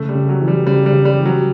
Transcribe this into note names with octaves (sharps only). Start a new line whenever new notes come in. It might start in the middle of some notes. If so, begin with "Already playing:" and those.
Already playing: C#3 A3
G3
C#3
F#3
E3
G3
C#3 G3
G3
C#3
G3
E3
F#3